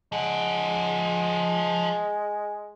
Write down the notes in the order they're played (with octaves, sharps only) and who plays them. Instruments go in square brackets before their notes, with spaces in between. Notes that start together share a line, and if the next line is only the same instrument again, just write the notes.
[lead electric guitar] F3 F#5 [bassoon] G#3